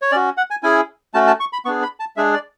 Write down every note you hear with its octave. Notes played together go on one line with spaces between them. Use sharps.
C#5
C#4 F#4 D5
F#5
G#5
C#4 E4 G#4 G#5
A3 C#4 F#4 A5
A5
C#6
B5
B3 D4 G#4 C#6
B5
A5
G#3 D4 G#4 E5
D5